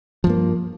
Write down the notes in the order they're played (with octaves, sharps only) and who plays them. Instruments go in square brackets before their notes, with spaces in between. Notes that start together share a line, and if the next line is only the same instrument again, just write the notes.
[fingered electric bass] F3
G2
A#3